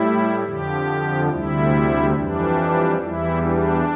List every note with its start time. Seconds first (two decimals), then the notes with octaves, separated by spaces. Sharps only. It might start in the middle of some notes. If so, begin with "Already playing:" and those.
Already playing: A2 G3 E4
0.43 F2 D3 F3 G4
1.28 D2 C3 G3 E4
2.14 F2 E3 G3 D4
3.00 E2 E3 G3 E4
3.42 D4